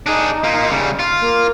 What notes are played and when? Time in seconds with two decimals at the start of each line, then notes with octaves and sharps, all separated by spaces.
0.06 D4 D#4 G#4
0.44 A#3 F4
0.70 C#3 G3
0.99 F4
1.21 A#3